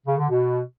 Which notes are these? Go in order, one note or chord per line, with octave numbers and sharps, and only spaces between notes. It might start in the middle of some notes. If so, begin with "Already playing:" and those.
C#3
D3
B2